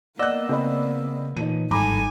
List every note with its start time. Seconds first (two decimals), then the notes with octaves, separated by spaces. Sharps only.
0.19 A#3 B3 D5 D#5 F#5 E6 F#6
0.49 C#3 C4 D#5 B5
1.37 A#2 E3 D#4 C#5 D#7
1.71 G#1 G2 D#4 A4 G#5 A#5 B5 D6